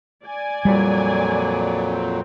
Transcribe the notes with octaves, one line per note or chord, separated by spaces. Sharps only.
D5 G#5
F2 A#2 F#3 G3
C4